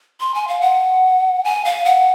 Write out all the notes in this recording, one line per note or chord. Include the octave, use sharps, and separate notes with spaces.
C6
G#5
F5
F#5
G#5
F5
F#5